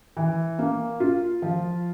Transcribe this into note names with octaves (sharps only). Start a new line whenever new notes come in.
E3
A#3
F4
F3